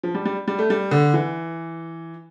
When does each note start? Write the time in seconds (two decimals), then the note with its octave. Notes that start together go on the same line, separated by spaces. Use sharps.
0.03 F3
0.15 G3
0.25 G3
0.48 G3
0.59 A3
0.70 G3
0.91 D3
1.14 E3